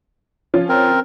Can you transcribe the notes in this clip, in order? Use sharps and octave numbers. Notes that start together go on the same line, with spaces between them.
F3 C#4 F4
C4 A#4